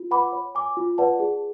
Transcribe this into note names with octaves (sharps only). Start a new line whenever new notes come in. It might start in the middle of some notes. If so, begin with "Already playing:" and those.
Already playing: F4
B4 F#5 B5 D6
C#5
G#5 D6
F4
B4 D5 F#5 A5
G#4